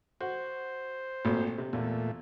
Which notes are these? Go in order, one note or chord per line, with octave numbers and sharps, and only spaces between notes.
F#4 C5
G#1 A#2 A3
C3
E2 A#2 A3